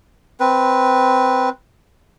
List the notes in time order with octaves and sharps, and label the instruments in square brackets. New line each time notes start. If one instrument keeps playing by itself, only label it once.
[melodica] C4 B4